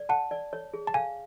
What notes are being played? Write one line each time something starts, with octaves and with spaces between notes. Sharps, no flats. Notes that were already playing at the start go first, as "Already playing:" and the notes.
Already playing: D5
F#5 A5
D5
C#5
G#4
A5
F5 G#5